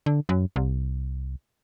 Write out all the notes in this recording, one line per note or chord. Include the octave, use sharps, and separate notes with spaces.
D3
F#2
C2